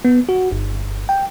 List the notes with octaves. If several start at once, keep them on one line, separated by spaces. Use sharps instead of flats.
B3
F#4
G1
G5